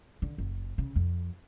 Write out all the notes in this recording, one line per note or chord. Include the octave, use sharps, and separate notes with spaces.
D3
F#1
C#3
F2